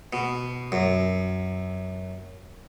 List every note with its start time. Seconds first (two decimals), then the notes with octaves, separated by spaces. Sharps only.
0.13 B2
0.72 F#2